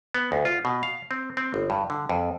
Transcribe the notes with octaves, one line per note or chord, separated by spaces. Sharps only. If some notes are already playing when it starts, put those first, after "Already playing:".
B3
D2
F4
B2
F5
C4
C4
G1
G2
D3
F2